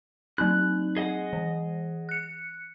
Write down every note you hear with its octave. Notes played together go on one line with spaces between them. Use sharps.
F#3 C4 D#4 F#6
G#4 D#5 F#5
E3
F#6 C#7